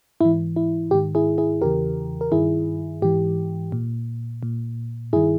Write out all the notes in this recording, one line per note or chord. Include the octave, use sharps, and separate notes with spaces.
G#2 E3 E4
E4
G#2 D#3 G4
E4 G#4
E4 G#4
E2 C#3 E3 G4 A#4
A#4
G2 D#3 E4 G#4
G#2 E3 G4
A#2
A#2
G2 D#3 E4 G#4